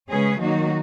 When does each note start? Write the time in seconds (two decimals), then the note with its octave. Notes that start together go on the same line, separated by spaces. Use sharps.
0.10 C#3 G#3 C#4 G#4 B4
0.39 D#3 F#3 A#3 D#4 F#4